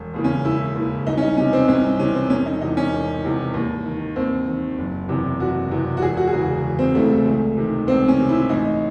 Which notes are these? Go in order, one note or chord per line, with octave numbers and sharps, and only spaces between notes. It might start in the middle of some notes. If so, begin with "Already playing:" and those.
Already playing: E1
D#2 C#3 E3
C#4
E1 E4
D#2 C#3 E3
C2 D#4
C#4
D#4
C3 E3 C#4
C4
C2 C#4
C3 E3 C#4
C4
E1 C#4
D#4
E2 C3 E3 D#4
C#4
E1
E2 C3 E3
D#2
D#3
D#2 C4
D#3
F#1
E2 C3 E3
F#1 F#4
E2 C3 E3
F#4
E1 G#4
F#4
G#4
E2 C#3 E3 F#4
E1
C4
E2 C#3 E3 A3
A3
C#2
C3 D#3
C#2 C4
C#4
C3 D#3
E4
A1 D#4